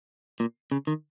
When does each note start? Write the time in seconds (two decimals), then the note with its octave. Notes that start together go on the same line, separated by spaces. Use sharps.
0.40 A#2
0.72 C#3
0.87 D#3